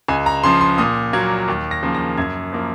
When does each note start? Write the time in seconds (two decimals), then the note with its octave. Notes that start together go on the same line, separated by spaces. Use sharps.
0.08 C#2 G#5
0.26 A#5
0.43 C#3 F3 C6
0.61 C6
0.78 A#2 D#6
1.13 F#3 A#3 G#6
1.48 D#2
1.71 A#6
1.83 C#3 F3 A#3
1.95 A#6
2.17 F#2 G#6
2.52 F3 A#3